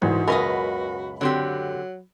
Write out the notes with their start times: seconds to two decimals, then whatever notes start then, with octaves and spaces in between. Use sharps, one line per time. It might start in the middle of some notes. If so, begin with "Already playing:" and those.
0.02 C2 G#2 E3 F#4
0.28 C#2 F#2 B2 A#4 B4 D#5 B5
1.21 D3 F#3 C4 G4